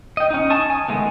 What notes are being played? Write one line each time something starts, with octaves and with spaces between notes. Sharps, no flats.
D#5 G5
C#4 D#4
G#5 A5 C#6 D#6
G#5
D#3 G#3 A3 B3